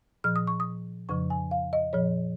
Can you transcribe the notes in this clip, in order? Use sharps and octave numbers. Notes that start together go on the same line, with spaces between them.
A#2 F3 F6
D#6
C#6
D#6
F2 C#3 F3 C#6
G#5
F5
D#5
A#2 F3 C#5